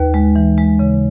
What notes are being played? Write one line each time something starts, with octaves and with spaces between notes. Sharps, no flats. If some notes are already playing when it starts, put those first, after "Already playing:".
Already playing: D#2 B4
G#3
E3
G#3
C#3